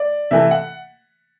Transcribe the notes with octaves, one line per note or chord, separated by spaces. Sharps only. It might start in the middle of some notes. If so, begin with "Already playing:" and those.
Already playing: D5
C3 E3 A3 E5
F#5